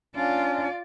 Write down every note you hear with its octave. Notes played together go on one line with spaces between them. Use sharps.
C#4 D4 F4 D5